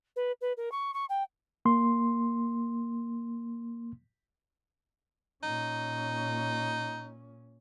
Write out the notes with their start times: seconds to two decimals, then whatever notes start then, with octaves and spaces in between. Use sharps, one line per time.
0.16 B4
0.41 B4
0.57 A#4
0.72 C#6
0.94 C#6
1.09 G5
1.65 A#3 C6
5.43 A#2 C#4 D#4